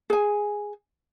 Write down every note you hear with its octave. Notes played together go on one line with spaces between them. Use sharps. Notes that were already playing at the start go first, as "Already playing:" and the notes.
G#4 G#5